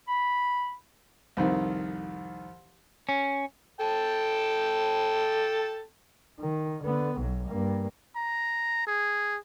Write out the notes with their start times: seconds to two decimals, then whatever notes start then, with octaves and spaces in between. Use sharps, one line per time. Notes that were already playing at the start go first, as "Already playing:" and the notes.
0.08 B5
1.37 C2 F2 D#3
3.09 C#4
3.80 A4 G5 A5
6.40 D#3
6.83 D3 B3
7.17 B1 F#3
7.48 G2 A#3
8.16 A#5
8.87 G#4